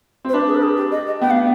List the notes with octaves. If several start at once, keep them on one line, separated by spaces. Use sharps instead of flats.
C4
C5
D4 B4
G#4
B4
G#4
G4
D#5
D#5
B3 G5
F5